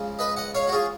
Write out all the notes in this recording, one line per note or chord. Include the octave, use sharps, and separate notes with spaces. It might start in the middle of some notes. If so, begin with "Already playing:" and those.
Already playing: C#3 F3 G#3
B4 D#5
D#5 F#5
C#5 F5
F#4
F4 G#4